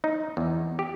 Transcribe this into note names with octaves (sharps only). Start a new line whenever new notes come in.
D#4
E2
G4